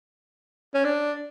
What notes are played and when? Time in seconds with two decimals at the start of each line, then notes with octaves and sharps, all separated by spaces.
0.74 C#4
0.85 D4